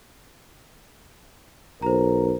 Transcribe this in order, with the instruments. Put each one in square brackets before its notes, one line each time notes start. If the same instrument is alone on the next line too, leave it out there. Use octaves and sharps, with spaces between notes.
[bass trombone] B1 [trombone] A#4 [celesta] C5 A#5